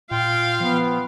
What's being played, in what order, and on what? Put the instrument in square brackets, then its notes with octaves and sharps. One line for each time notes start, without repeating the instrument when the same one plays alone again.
[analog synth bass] A#2 [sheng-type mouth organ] F4 G5 [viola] F5
[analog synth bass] F3 [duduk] B3